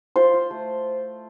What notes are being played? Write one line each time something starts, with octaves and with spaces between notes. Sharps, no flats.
F4 C5
F4
A3